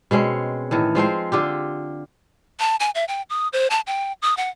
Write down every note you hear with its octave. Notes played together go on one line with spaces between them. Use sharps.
B2 G#3 C4 C#4
A2 D#3 E3
F3 G#3 C4 C5
D3 F4 G4
A5
G#5
E5
G5
D#6
C5
A5
G5
D#6
F#5